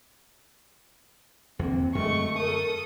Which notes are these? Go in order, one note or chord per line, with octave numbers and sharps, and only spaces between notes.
E2 D3 A#3 C4
F#2 D3 G#3 A3 C#6
A4 A#4 D#6